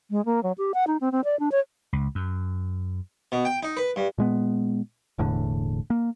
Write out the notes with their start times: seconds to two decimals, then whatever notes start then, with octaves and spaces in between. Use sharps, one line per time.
0.11 G#3
0.25 A#3
0.43 F#3
0.58 G4
0.74 F#5
0.87 D#4
1.01 C4
1.12 C4
1.24 D5
1.40 D4
1.52 C#5
1.93 C#2
2.15 F#2
3.32 B2
3.45 G5
3.63 D#4
3.77 B4
3.96 G2
4.18 A#2 G#3 B3
5.18 E1 E2 A2 D3
5.90 A#3